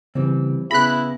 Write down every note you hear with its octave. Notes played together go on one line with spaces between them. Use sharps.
C#3 E3 G3 C4
C#3 B3 E4 G#4 B5 F#6 A#6